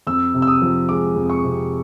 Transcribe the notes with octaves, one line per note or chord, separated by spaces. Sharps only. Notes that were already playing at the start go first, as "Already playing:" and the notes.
F2 E6
C3
E6
D#6
F3
G#3 D6
F2
C#6
C3